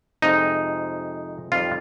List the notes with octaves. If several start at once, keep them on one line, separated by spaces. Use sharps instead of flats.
F2 C3 F3 G#3 D#4
F2 D#3 G3 F4